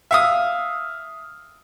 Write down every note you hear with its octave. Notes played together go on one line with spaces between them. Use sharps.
E5 F5 D#6